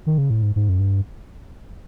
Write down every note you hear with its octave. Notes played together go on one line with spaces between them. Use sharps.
D#3
C#3
A2
G#2
G#2
F#2
G2